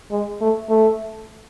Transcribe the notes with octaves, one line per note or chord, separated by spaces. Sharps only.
G#3
A3
A3